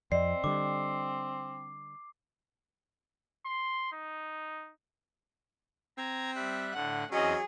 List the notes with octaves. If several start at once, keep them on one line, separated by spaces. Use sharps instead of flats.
F2 C4 D5 D#5 C7
D3 G3 D6
C6
D#4
C4 A#5 G#6
G3 E5 F#6
A2 D3 F#5
E2 F#3 C4 C#4 G#4 D#5